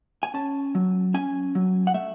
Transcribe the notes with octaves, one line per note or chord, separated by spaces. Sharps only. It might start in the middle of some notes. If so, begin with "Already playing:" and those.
G#5
C#4 A5
F#3
C#4 G#5
F#3
F#5
A3 E5